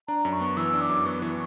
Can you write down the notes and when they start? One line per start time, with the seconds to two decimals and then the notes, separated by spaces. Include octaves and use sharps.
0.08 D4 A#5
0.25 F#2
0.33 C#6
0.41 B3
0.57 E3 E6
0.73 D4
0.81 D6
0.89 F#2
1.06 B3 C#6
1.22 E3